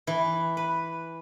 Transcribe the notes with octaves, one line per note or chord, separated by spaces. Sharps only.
E3
B4